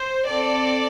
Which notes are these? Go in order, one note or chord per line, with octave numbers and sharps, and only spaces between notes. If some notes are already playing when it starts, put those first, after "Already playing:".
Already playing: C5
C4 A4 D5